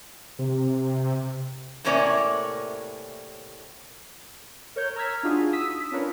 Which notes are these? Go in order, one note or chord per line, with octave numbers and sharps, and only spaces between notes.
C3
A2 C3 A#3 C#4 C#5 D5
A#4 C#5 G6
A#5 E6 F6 G#6 B6
D4 D#4 F4 F#4 G#4
D#6 E6 B6
C#4 D4 F4 A#4 B4 C#5